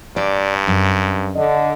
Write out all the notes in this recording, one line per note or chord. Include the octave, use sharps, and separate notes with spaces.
G2 D5
F#2
D3 D#5